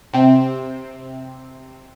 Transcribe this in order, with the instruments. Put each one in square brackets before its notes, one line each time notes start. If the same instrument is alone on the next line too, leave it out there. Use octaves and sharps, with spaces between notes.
[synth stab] C3 C4